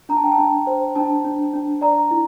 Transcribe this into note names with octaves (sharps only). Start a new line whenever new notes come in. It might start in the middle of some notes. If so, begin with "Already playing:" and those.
D4 A#5
A5
G5
A5
D4
C5
D4 A5
D4
D4
D5 A#5
E4